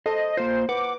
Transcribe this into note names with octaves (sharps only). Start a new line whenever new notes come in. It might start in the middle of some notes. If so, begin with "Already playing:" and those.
A4 C5 D#5
A#3 F4 C5
B4 F#5 D6